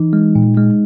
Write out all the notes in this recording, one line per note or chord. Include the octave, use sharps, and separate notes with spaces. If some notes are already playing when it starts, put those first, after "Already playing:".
Already playing: E3 D#4
G#3
A#2
G#3